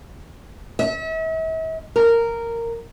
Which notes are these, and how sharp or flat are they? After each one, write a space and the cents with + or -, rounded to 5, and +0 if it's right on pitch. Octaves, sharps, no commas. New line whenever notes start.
E5 -40
A#4 -10